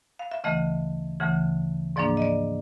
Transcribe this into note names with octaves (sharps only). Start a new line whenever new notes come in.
F5
E5
D2 C#3 E3 A3 D#5
D2 C#3 E3 A3
G#2 F3 A#3 D4 D5
D#5
D5